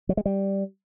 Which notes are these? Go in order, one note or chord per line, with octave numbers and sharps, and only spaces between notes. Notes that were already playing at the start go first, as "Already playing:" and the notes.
F#3
G#3
G3